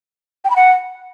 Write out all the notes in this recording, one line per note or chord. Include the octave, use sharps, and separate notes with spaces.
G5
B5
F#5